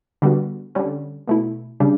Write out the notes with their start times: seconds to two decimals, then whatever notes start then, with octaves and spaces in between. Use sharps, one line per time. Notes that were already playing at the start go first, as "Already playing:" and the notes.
0.22 D3 G3 B3 F#4
0.75 D3 G3 C#4
1.27 B2 A3 E4
1.80 C#3 G3 D4